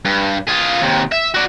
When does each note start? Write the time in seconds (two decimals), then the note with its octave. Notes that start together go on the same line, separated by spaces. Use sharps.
0.05 G2
0.47 F4 G#4
0.81 D#2 C3
1.12 E5
1.34 F#4 D5